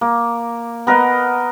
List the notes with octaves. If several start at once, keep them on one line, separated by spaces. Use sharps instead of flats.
A#3
B3 A#4 D#5 F#5